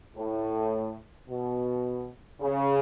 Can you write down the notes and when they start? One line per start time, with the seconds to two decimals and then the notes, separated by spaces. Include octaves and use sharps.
0.17 A2
1.29 B2
2.42 C#3